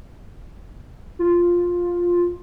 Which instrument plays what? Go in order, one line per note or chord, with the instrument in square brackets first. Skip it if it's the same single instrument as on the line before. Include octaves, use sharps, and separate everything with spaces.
[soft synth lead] F4